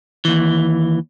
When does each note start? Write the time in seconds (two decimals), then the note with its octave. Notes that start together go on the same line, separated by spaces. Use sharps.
0.25 D#2 E3